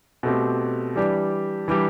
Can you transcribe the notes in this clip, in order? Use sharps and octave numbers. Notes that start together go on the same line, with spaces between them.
B2 A3 C4 G4
E3 G3 D4 G4
E3 G3 D4 G4